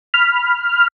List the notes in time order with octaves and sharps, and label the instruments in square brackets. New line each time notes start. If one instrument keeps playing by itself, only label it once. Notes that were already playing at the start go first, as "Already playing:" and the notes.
[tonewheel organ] B5 F6